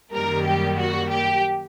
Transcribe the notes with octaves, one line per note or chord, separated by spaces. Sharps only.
F#2 D#3 G3 A#3 A#4
G4
F#4
G4